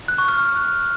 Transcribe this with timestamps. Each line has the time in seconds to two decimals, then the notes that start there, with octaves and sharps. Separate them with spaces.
0.08 F#6
0.18 C#6
0.28 F6